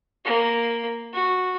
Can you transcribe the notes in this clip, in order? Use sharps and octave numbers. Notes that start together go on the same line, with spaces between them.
A#3
F#4